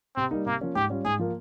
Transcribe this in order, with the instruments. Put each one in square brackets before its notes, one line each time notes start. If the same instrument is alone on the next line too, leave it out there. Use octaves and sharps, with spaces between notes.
[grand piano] C3 [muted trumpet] C4
[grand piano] G3 A#3 D#4
[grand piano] C3 [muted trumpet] A#3
[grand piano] F3 A#3 C#4
[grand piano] G#2 [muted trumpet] G4
[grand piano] G3 C#4 F4
[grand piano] G#2 [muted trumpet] G#4
[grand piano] F3 A#3